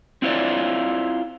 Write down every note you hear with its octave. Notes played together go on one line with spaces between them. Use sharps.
C4 E4 F4 G#4 C#5 D5